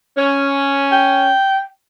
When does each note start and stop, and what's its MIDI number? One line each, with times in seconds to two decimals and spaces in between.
0.17 1.29 61
0.92 1.63 79